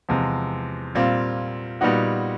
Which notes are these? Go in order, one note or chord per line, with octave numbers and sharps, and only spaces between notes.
E2 C3 F3 G#3
A#2 G3 C4 F4
A#2 G3 B3 D#4 F#4